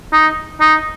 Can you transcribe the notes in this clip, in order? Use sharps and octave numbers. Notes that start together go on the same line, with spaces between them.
D#4
D#4